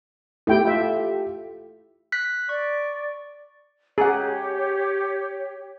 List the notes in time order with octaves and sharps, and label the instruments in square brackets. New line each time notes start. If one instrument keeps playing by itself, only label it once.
[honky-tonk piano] A3 G4 [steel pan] E4 G5
[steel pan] F4 E5
[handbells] F#6 B6
[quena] D5 [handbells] C#6
[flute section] G4 C#5 [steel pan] G#4 F#5